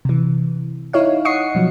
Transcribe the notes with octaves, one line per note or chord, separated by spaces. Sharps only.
C3 E3
D#4 E4 C#5 F5
D#5 F#5 C#6 D#6 C7 C#7
B2 F3 F#3